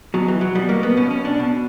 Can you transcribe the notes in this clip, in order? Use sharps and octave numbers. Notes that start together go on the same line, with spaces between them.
B2 F#3
E3
F#3
B2 G3
A#3
B3
B2 C#4
C#4
D4
B2